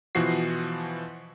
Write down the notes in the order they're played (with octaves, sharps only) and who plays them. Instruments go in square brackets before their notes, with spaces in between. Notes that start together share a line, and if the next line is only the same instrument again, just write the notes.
[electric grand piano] B2 E3 F3 F#4 C7